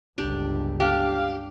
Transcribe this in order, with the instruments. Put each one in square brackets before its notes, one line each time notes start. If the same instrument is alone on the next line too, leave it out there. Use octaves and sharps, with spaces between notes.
[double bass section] G1 C#2 [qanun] D4 G4
[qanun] D4 [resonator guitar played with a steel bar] G4 [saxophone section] F5